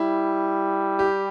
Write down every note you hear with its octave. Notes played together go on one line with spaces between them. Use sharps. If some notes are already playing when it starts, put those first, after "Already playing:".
Already playing: G3 E4
G4